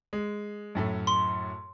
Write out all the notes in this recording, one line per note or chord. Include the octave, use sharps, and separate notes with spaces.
G#3
F#2 A2 A3
C6